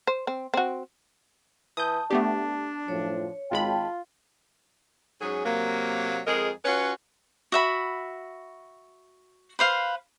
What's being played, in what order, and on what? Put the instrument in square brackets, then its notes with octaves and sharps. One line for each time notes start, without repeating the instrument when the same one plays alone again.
[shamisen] C5
C4
C4 F#4
[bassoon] E3 [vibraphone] A5 [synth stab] D#6 G6
[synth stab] A3 B3 G4 [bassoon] D4
[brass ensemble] F#2 A2 F3 [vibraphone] C#5
[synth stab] G#1 G#3 B5 [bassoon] F4 [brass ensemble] G5 A5
[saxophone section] G#2 F#3 C#4 G#4
C3 F#3 A#3
F2 G#3 G#4 A#4 D#5
C#4 F4 F#4 B4 C#5
[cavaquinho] F#4 E5 B5
B4 C5 F5